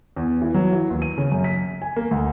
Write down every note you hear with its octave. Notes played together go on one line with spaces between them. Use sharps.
E2
E3
F#3
E3
D#2
D#7
C#3
F#2
B6
G#5
A#3
D2